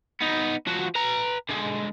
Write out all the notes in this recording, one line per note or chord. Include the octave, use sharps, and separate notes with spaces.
B3 D#4
F3 F#4
B4 A#5
D3 G#3